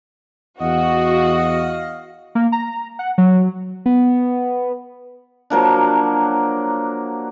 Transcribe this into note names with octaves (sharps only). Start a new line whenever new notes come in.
E2 F#4 D#5 F5
A#3
A#5
F#5
F#3
B3
F3 F#3 A#3 D4